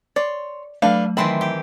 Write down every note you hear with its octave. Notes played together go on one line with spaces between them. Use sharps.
C#5 D5 C6
F#3 A3 D4 A4 B4 F5
D#3 E3 C4 E4 A5 B5 C6
G4